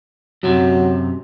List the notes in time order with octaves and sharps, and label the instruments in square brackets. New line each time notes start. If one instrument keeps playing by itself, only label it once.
[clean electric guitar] F#2 C3 [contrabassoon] F#3